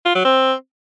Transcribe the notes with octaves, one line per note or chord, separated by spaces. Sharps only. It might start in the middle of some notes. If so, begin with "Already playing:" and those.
F4
F#3
C4